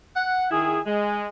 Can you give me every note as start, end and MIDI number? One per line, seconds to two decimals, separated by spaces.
0.15 0.46 78
0.50 0.79 51
0.50 0.79 64
0.50 0.79 68
0.85 1.25 56